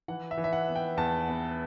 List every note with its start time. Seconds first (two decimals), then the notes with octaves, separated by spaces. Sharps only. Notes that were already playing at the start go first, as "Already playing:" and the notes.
0.08 E3 F#5
0.31 E5
0.38 E3
0.44 E5
0.53 F#5
0.68 B3
0.76 G5
0.97 E2 A5
1.28 B3